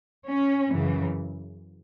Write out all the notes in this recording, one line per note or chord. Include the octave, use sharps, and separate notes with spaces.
C#4
F#2 C#3 E3